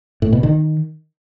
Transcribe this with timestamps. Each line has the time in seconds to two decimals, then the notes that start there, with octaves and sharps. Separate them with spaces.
0.22 A2
0.33 B2
0.43 D#3